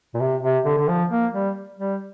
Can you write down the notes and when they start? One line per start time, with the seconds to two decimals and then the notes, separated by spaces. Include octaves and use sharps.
0.14 A#2
0.20 C3
0.43 C3
0.65 D3
0.78 D3
0.88 F3
1.10 A#3
1.33 G3
1.79 G3